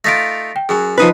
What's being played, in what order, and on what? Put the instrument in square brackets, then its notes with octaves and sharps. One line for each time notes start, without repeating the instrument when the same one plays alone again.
[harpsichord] A3 D#4 F4 [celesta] A#6 B6 D7
[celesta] G5
[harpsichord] F#2 F#3 [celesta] G#4 G#5
[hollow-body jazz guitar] F3 D#4 B4 [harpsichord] D#5 B5